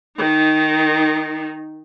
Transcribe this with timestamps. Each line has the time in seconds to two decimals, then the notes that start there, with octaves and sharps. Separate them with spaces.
0.17 D#3 D#4